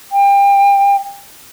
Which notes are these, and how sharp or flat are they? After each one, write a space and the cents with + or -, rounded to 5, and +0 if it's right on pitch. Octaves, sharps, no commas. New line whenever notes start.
G5 +30